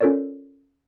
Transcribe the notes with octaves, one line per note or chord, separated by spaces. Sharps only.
C#4 F4 A4 A#4 C#5 D5